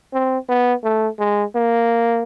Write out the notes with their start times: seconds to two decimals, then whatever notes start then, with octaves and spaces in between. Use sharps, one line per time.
0.13 C4
0.49 B3
0.84 A3
1.19 G#3
1.55 A#3